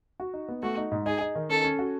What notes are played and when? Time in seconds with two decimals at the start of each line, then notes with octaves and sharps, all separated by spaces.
0.20 F#4
0.34 D#4
0.49 B3
0.63 A3 F#4
0.77 D#4
0.91 G#2
1.06 D#4 G#4
1.21 D#4
1.35 D#3
1.49 C#4 A4
1.64 C#4
1.79 F#4